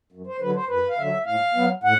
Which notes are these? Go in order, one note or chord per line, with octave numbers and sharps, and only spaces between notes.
F#2
C5
D3 F#3 B4
C5
F#2 B4
F5
D3 F#3 E5
A2 F5
F#3 B3
A2 F#5